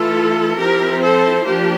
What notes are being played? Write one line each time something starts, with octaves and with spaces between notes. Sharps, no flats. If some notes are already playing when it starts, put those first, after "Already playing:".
Already playing: E3 A3 E4 F4 A4
F3 C4 E4 G4 A#4
A4 C5
F3 A#3 D4 G4